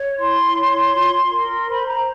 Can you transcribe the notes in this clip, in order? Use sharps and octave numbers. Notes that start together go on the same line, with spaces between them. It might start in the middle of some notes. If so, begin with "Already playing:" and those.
Already playing: C#5
E4 C6
C#5
F4
A#4
C5 B5
A#5